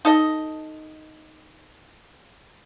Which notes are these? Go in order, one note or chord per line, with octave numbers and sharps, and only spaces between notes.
D#4 A4 D#5